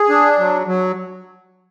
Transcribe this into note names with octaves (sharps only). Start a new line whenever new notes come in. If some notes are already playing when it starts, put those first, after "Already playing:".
Already playing: G#4
D4
F#3
F#3